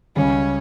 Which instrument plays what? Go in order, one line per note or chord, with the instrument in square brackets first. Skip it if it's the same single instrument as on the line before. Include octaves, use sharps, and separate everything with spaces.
[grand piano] C#2 C#3 G3 [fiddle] C#4